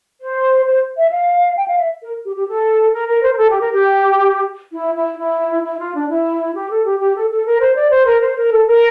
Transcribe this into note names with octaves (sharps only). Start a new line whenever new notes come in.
C5
C5
E5
F5
G5
F5
E5
A#4
G4
G4
A4
A#4
A#4
C5
A#4
A4
G4
A#4
G4
E4
E4
E4
E4
F4
D4
E4
G4
A4
G4
G4
A4
A4
A#4
C5
D5
C5
A#4
C5
A#4
A4
A#4